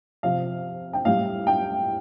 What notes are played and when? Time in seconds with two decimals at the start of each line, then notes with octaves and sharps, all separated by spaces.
0.23 C3 F3 F5
0.93 G5
1.05 A2 G3 F5
1.47 G5